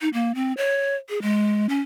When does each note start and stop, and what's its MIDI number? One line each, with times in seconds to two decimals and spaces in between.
0.01 0.09 63
0.13 0.32 58
0.35 0.53 60
0.57 0.95 73
1.09 1.21 68
1.22 1.66 56
1.69 1.80 61